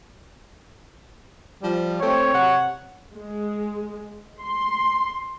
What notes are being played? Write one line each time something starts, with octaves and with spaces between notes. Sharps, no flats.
F3 G3
A3 C4 C#5
C3 F#5
G#3
C6